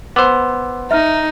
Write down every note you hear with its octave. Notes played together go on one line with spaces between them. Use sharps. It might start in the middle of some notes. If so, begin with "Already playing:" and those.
B3 C5 D6 E6
D#4 E5 F6